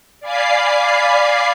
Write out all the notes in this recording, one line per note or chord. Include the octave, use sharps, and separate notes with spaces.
D5 F5 G#5 B5 D6 C7